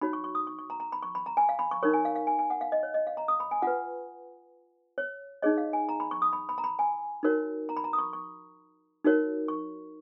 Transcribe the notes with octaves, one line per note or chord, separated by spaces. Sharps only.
D#4 F#4 C#5 B5
C#6
C#6
D#6
C#6
C#6
A#5
A#5
B5
C#6
B5
A#5
G#5
F5
B5
C#6
D#4 A#4 C#5 C#6
G#5
F5
F5
G#5
G#5
F#5
F5
D#5
C#5
D#5
F5
A#5
D#6
B5
G#5
F4 B4 F#5
C#5
D#4 G#4 C#5 D#5
F5
G#5
A#5
B5
C#6
D#6
B5
B5
A#5
B5
G#5
D#4 F#4 A#4 C#5
A#5
B5
A#5
D#6
C#6
C#6
D#4 F#4 A#4 C#5
C#6